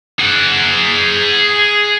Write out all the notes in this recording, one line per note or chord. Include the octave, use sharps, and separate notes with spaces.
G#4 F#5